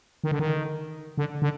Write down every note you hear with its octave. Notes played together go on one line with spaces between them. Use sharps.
D#3
D3
D#3
D3
D3